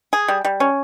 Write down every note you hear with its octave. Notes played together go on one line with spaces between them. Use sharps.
G#4
G3
G3
C#4